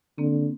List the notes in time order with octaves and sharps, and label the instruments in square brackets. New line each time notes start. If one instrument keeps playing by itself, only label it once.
[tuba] D3 [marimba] A#3 C4